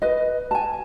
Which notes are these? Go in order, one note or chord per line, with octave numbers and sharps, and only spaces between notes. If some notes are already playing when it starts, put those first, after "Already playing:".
B4 D#5
G#5 A5